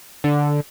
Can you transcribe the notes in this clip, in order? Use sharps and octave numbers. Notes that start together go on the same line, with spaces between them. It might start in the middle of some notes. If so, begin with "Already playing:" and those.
D3